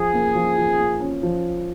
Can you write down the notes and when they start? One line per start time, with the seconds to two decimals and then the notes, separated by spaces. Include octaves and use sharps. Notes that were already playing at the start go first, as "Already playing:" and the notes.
Already playing: F3 G#4
0.14 A#3
0.35 F3
0.58 F3
0.79 A#3
1.00 C#4
1.23 F3